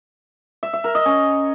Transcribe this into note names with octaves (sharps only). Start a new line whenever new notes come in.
E5
E5
A#4
D#5
C#4